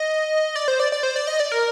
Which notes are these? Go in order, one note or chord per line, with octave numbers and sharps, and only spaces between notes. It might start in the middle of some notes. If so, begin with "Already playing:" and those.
Already playing: D#5
D5
C5
D5
D5
C5
D5
D#5
D5
A#4